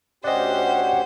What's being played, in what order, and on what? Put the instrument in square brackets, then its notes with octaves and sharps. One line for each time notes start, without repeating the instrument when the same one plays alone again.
[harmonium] D2 C#4 G4 [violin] C5 [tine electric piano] D5 D#5 [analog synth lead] F#5